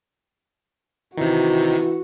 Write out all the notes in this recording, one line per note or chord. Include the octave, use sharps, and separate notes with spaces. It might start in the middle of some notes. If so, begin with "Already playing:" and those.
C3 D#3 E3 F#4